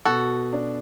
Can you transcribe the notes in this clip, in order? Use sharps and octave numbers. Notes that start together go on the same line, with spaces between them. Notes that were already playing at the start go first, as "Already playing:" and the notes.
B2 F#4 A4
D4